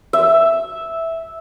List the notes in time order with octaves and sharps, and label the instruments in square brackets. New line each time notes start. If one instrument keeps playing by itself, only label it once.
[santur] E5